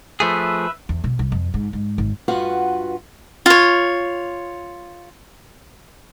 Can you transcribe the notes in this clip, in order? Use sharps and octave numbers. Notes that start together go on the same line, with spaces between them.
F3 A3 G#4 B4 E5
E2
B2
C2
F2
G#2
G#2
G#1
G2 F4 F#4 B4 F#5
F4 C#5